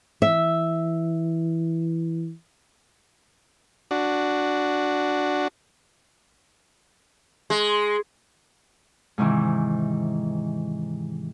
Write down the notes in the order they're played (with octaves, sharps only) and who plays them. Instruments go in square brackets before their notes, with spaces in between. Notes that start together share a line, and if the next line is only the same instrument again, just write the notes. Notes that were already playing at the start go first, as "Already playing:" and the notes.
[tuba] E3 [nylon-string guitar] E5
[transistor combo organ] D4 F#4
[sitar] G#3
[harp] G#2 C3 D#3 E3